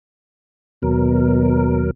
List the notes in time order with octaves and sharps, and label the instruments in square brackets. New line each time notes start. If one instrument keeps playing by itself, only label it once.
[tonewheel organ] D#2 F#3 A#4 [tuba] B2